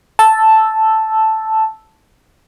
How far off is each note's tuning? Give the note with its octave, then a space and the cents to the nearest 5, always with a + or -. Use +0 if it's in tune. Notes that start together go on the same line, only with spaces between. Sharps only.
A5 +0 E6 +0